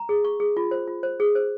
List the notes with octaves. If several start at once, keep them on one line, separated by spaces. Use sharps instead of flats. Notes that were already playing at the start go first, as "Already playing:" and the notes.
Already playing: A#5
G#4
C#6
G#4
F4
C5
F4
C5
G#4
C5